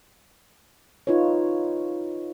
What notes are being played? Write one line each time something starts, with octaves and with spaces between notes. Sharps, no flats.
D#4 F4 B4 C#5